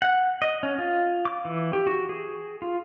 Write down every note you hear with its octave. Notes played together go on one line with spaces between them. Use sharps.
F#5
D#5
C#4
F4
D6
E3
G4
F#4
G#4
F4